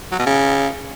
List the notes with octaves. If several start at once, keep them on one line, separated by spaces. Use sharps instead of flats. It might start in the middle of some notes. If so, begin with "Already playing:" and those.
F#3
B2
C#3